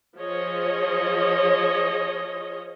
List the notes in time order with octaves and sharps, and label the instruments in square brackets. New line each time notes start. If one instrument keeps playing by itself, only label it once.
[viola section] F3 G#4 C#5 D#5